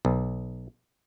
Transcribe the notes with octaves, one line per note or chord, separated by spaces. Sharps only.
B1